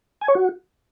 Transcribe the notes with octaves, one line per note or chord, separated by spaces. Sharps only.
G#5
C#5
F#4